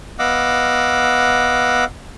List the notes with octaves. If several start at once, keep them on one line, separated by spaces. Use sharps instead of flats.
B3 D#5 F5 F#5 D6 E6